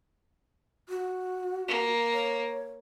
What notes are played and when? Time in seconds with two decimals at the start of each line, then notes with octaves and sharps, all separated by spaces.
0.89 F#4
1.68 A#3
2.13 C#5